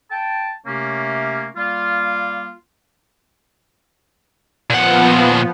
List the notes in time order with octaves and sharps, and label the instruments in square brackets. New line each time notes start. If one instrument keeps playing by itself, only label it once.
[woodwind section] G5 A5
C3 A3 A#3 C#4
G3 A#3 F4
[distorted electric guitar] A#2 F#5 [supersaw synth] F3 B3